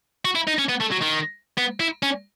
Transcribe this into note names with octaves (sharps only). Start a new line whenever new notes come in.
F#4
E4
D#4
C#4
B3
A3
F#3
D#3
B3
E4
C#4